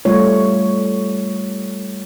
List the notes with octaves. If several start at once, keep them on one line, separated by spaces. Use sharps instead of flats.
G3 A3 F4 C#5